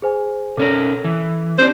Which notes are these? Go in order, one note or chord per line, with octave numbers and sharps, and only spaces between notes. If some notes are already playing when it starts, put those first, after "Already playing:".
G#4 C5 G#5
B2 C#4 A4 A#4
E3
C4 D4 G4 C5